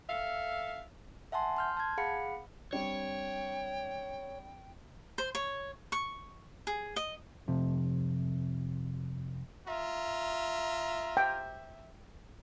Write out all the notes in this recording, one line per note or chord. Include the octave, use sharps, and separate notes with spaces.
A4 E5 F5
E5 F#5 G#5 A5 C6
C6 F6 G6
A5 G#6
G#4 F5 F#5 B5 C#7
G3 C4 D4 C#5 G5
C5
C#5
C#6
G#4
D#5
F2 C3
F4 E5 A#5
G5